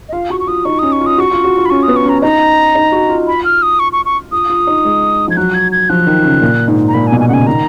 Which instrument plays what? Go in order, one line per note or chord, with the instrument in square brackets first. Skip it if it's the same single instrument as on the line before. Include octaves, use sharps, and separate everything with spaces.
[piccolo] D#5
[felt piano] F4 [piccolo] F5
[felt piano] F#4 [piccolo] C#6
[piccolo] C#6
[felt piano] F4 [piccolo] D#6
[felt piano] D#4 [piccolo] C#6
[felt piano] C#4 [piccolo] D#6
[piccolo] C#6
[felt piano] F4
[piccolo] D#6
[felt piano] F#4 [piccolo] C#6
[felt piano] F4
F#4
F4
[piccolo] B5
[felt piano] C#4 [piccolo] C#6
[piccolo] D#6
[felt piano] B3
[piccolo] C#6
[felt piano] C#4
[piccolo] A#5
[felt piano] D#4 [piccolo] A#5
[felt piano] D#4
F#4
F4
[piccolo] B5
F6
D#6
C#6
C#6
C#6
[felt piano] F4 [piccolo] D#6
[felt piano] F4
D#4
G#3
[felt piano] F3 [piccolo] G#6
[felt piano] F#3 [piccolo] F#6
[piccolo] G#6
G#6
[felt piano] F3 [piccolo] F#6
[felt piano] D#3
C#3
A#2
G#2
[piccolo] A#5
[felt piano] A#2 [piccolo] B5
[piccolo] G#5
[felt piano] B2
[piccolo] G#5
[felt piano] C#3 [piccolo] F#5
[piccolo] G#5
[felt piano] D#3 [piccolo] A#5